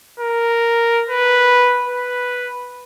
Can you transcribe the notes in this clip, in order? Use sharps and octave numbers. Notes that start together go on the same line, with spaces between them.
A#4
B4
B4